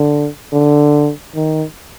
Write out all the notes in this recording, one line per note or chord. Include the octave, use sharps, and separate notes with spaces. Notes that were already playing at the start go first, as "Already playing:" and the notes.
Already playing: D3
D3
D#3